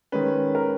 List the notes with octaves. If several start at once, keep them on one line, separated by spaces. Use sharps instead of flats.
D#3 G#3 C#4 B4
A#4